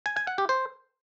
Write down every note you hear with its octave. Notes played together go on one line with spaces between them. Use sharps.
G#5
G#5
F#5
G4
C5